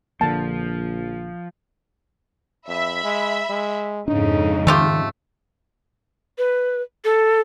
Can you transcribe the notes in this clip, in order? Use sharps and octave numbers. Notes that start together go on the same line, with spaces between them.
A#1 D3 F3 A#3 A5
F2 E5 B5
G#3
G#3
F2 G#2 C#3 D4 D#4
D#3 A3 F4 G4
B4
A4